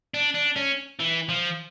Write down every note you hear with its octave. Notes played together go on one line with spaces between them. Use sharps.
D4
D4
C#4
E3
F3